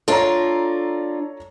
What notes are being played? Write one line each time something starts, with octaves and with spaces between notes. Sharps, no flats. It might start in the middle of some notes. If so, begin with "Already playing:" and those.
D4 F4 A4 C#5 A#5